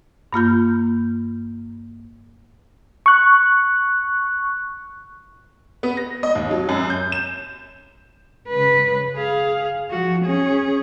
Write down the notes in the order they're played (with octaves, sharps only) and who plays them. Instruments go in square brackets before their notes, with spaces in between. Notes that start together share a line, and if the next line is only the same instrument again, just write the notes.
[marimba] G2 A#3 F4 G6
[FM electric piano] C#6 F#6
[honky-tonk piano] B3
A#6
D#5
D#2
F#3
F#2
G6
E7
[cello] C#3 B4
G#4 F5
F3 F#4
C#4 G#4